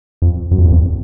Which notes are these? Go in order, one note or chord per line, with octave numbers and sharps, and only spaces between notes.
F2
F#2
F2
E2
F2